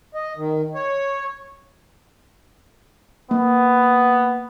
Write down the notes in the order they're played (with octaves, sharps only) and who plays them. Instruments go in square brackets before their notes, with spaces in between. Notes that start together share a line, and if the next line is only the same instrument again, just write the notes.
[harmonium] D#5
D#3
C#5
[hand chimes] A#3 [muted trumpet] B3